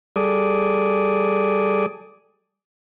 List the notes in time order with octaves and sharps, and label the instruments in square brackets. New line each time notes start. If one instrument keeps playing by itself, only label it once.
[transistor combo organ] G3 G#4 A4 D5 D6 D#6